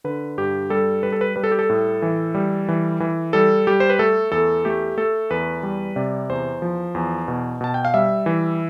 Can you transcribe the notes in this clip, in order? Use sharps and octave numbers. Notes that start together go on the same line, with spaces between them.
D3 B4
G2 G4
G3 A4
G3 B4
A4
B4
G3 B4
A4
G4
A4
A2
E3
G3
E3
E3
G3 A4
G3 G4
C5
B4
A3 A4
E2 A4
A3 G4
A3 A4
E2 B4
G3
C3 D5
E2 C5
F3
E2
B2
B2 A5
G5
F5
G3 E5
E3